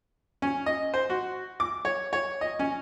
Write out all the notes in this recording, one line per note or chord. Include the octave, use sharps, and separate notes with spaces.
C#4
D#5
C5
F#4
D6
C#5
C#5
D#5
C#4